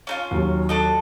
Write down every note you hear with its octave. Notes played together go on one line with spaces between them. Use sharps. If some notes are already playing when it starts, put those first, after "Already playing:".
C#4 D#4 F4
D#2 F#3
D4 A4 D#5